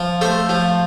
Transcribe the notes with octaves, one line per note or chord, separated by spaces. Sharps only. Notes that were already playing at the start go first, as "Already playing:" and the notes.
Already playing: F3
A3 A4 C5
F3